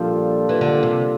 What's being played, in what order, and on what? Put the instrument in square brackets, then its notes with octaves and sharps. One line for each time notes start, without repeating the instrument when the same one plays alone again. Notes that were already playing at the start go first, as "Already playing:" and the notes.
Already playing: [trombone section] A#2 G3 D4 F4 A4 [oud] F3
[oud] E3
D3
C3